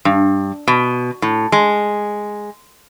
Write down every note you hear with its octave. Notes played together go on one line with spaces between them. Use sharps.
G2
B2
A2
G#3